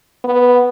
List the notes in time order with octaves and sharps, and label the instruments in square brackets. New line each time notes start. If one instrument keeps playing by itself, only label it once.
[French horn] B3